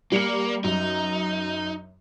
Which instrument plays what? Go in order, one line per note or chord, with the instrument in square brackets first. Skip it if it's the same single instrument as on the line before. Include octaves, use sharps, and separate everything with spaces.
[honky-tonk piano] G3 C#7 F#7 [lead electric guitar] A#3
[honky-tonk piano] F#2 [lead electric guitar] D#4